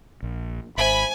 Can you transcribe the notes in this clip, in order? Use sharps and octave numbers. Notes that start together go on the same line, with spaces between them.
A#1
G#1 C5 E5 G#5 B5